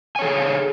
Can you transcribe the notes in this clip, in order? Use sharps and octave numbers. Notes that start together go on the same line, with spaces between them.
G#4 A4 C#5 G#5